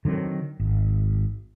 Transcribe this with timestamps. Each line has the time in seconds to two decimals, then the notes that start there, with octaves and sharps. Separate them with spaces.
0.05 D3 D#3 F#3 C4
0.60 G#1